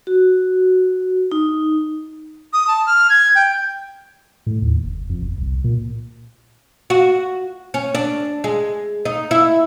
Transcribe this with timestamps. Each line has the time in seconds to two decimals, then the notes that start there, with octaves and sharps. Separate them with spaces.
0.07 F#4
1.32 D#4
2.53 D#6
2.67 A5
2.86 F6
3.09 G#6
3.35 G5
4.46 A2
4.62 D#2
4.84 F1
5.10 F2
5.22 F#1
5.38 C2
5.64 A#2
6.90 F#4
7.74 C#4
7.95 D4
8.44 G#3
9.05 D#4
9.31 E4